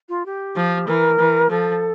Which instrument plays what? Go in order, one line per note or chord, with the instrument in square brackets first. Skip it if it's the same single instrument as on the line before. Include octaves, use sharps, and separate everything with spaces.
[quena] F4
G4
[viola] F3
[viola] E3 [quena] A#4
[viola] E3
[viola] F3 [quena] A4